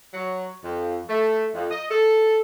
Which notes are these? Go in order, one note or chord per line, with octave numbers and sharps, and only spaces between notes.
F#3
F2
A3
F2
D#5
A4